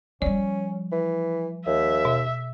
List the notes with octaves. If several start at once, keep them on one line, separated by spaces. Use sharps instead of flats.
F3 G3 C#4 D5
E3
D#2 E5
B2